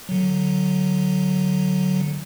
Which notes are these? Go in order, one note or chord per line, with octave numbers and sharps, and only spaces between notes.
D3 F#3